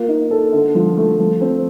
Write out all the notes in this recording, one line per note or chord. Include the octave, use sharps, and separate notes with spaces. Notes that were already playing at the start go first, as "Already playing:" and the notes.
Already playing: A#3 F4
D#4
A4
D3
F3
A3
F3
C4